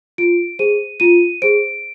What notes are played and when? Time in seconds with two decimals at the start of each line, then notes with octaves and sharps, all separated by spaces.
0.18 F4 D7
0.59 G#4 C5 D#7
1.00 F4 D#7
1.42 G#4 C5 D7